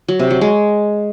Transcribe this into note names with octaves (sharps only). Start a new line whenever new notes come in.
F#3
C3
F#3
G#3